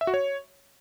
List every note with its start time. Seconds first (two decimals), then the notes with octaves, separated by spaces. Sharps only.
0.01 E5
0.07 F#4
0.14 C#5